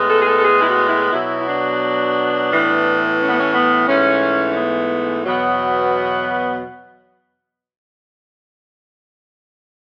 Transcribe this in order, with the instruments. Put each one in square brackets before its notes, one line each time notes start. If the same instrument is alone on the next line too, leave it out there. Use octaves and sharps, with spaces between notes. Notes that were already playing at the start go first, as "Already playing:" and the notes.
Already playing: [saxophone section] A2 G#3 B3
A4
G#4
A4
A4
G#4
E4
F#4
E4
B2 F#3 B3 E4
E4
D4
A2 E3 B3
C#4
B3
C#4
B3
G#2 E3 A3 C#4
C#4
B3
E2 B2 F#3 B3